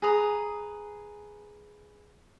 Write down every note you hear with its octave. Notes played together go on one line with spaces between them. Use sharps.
G#4 B4 A#5 D#6